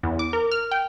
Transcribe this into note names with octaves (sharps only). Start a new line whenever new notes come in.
E2
D6
A#4
F6
G5